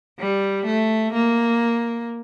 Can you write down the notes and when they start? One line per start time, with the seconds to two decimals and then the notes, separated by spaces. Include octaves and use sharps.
0.19 G3
0.66 A3
1.13 A#3